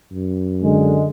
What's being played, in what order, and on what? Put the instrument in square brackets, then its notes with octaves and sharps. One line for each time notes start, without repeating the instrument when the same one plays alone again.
[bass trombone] F#2
[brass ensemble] D3 G#3